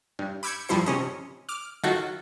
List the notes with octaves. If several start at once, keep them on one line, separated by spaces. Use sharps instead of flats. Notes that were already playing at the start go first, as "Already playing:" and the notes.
G2
B5 D6 E6 G6 G#6 C#7
G2 F3 G3 E4 C5 C#7
C3 C#4 D#5
D6 F6
D#3 F#3 F4 F#4 A4